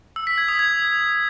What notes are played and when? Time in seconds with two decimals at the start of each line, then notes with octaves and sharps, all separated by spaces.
0.16 E6
0.27 B6
0.38 G#6
0.48 D#6
0.59 G#6